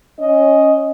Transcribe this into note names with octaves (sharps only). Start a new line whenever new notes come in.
C#4 D#5